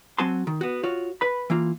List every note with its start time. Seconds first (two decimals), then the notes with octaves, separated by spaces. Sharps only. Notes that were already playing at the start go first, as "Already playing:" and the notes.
0.18 F#3 C4 F#4 G#5 A5 C6
0.47 D#3
0.61 B3 F#4
0.83 F4 F#4 C#5
1.21 B4 B5
1.50 E3 A#3 F4